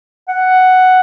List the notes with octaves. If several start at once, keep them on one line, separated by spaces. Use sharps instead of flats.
F#5